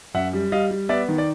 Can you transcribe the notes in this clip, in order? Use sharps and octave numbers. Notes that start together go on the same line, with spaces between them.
F#2 E5 F#5
G3
G3 D#5 F5
G3
B3 D5 E5
D#3
D5